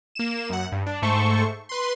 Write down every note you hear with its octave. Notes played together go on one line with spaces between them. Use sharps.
A#3 E7
F#2 F#5
G2
D4
G#2 A3 A4 C5 C#6
B4 C6